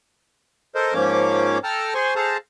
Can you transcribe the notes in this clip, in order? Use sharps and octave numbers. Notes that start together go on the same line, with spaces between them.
A4 A#4 C5 D#5
G#2 F3 A#3 C#4 C#5 D6
A4 G5 A5 A#5 F6
G#4 C5 G#5 C6 C#6
G#4 A4 C5 F5 A5 A#5